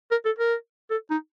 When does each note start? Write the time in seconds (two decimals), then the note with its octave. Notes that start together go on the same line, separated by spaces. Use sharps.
0.12 A#4
0.26 A4
0.39 A#4
0.90 A4
1.11 D#4